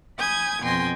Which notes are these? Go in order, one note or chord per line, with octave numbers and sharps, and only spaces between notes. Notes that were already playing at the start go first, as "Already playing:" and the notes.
G#5 B5 D#6 G6 G#6
F2 B2 G5 G#5 C6 A#6